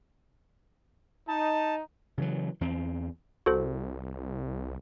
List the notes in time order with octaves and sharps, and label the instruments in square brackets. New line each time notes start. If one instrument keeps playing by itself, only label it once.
[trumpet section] D#4 [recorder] A5
[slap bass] C#3 E3 F#3
E2 C4
[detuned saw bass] C2 [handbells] F#4 A4 C5